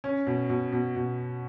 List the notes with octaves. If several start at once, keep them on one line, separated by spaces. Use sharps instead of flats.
C#4
B2
B2
B2
B2